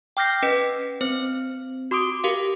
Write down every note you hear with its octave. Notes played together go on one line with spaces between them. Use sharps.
G5 D6 F6 G6 A#6 C7
C#4 B4 D#5 B6
C4 C5
F#4 C6 D6 D#6 D7
G4 A#4 F5